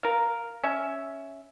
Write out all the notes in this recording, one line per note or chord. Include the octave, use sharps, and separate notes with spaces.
A#4 F5
C#4 E5